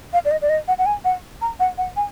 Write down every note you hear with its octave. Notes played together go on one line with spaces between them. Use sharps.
F5
D5
D#5
D5
D#5
F#5
F#5
G#5
F#5
A#5
F#5
F#5
G#5